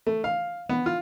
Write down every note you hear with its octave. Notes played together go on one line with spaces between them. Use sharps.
A3
F5
B3
F4